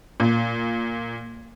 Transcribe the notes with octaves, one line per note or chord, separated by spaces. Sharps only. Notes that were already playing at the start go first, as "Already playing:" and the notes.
A#2